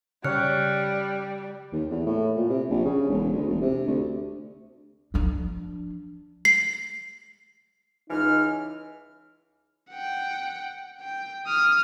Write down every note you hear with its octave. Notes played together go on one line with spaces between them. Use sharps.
C#3 G3 C#5 F6 F#6 C#7
D#2
E2
A2
A#2
C3
A#1
C#3
E1
D2
E1
C3
D2
F3 D4
C7
C#2 E3 D#4 F6
F#5 G5
G5
D#6 F6